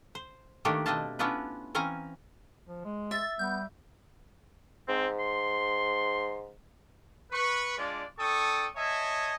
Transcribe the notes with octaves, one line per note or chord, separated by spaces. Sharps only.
C5
D#3 A3 A#3 D4 D#4 G4
B2 C4 D4 D#5 F5 A5
B3 C#4 D4 E4 F4 B4
E3 C4 C#4 F5 G#5 A#5
F3
G#3
E5 A6
G3 B3 G6
G#2 C4
C6
B4 C#6
G#3 D4 F4 D5
D4 A4 G5 C#6 D#6
C#5 D#5 E5 G#5 A5